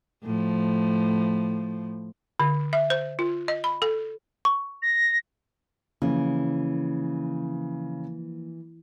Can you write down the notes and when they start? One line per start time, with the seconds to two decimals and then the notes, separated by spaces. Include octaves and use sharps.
0.24 A2 F3
2.40 D3
2.73 E5
2.90 C5
3.19 F4
3.48 D#5
3.64 B5
3.82 A4
4.45 C#6
4.82 A#6
6.02 C#3 E3 F3 A#3